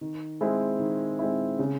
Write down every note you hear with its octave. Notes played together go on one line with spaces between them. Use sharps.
D#3
G#3 C4 E4
D#3
G#3 C4 E4
C#3